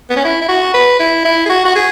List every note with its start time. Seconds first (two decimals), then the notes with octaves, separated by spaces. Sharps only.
0.10 B3
0.16 C#4
0.24 E4
0.41 E4
0.48 F#4
0.74 B4
1.00 E4
1.25 E4
1.46 G#4
1.49 F#4
1.65 F#4
1.75 G#4